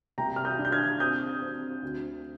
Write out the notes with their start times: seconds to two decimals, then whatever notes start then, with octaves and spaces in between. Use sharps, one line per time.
0.18 C2 G5 A#5
0.36 F6
0.45 D#6 G6
0.59 D4
0.65 G6
0.72 F6 G#6
1.00 C4 D#6 G6
1.42 C4
1.83 D2